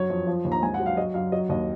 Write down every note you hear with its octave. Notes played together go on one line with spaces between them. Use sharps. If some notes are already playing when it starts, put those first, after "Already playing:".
Already playing: F#2 F#3 C#5
F2
F3
D#2
A#5
G#2 G#5
F#5
F#3
F5
F#3 D#5
F#2 F5
F#3 D#5
D#2 D#5